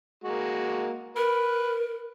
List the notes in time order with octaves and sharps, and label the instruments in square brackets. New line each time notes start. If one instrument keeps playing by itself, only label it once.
[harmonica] G#3 A#3 F#4
[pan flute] A#4 [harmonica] B4